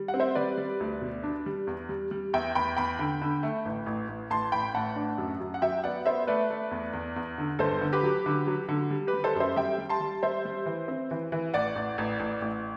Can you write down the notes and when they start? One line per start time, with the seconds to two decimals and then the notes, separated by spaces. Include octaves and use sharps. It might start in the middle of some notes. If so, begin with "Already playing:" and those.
Already playing: G3
0.08 F#5
0.14 C4
0.20 C5 E5
0.35 G3 B4 D5
0.58 G3
0.80 D2
1.01 B2
1.23 D4
1.46 G3
1.67 E2
1.89 G3
2.11 G3
2.34 E2 E5 G5
2.55 E2 G5 B5
2.77 E2 G5 B5
2.99 D3
3.22 D3
3.43 A3
3.65 A1
3.86 A1
4.08 A1
4.30 A1 A5 C6
4.52 A1 G5 B5
4.74 A2 F#5 A5
4.96 D4
5.18 F#2
5.40 F#2
5.54 F#5
5.62 F#3 E5 G5
5.84 B3 D5 F#5
6.06 B3 C5 E5
6.27 A3 B4 D5
6.50 A3
6.71 E2
6.93 E2
7.16 E2
7.38 D3
7.59 G1 A4 C5
7.81 D3
7.93 G4 B4
8.03 F#3
8.26 D3
8.47 F#3
8.69 D3
8.90 G3
9.07 G4 B4
9.14 G3
9.24 A4 C5
9.35 F#2
9.40 C5 E5
9.56 G3 E5 G5
9.78 G3
9.89 A5 C6
10.00 G3
10.23 G3 C5 E5
10.45 G3
10.66 E3
10.88 C4
11.11 E3
11.32 E3
11.54 A1 D5 F#5
11.75 A1
11.98 A1
12.20 A1
12.42 A1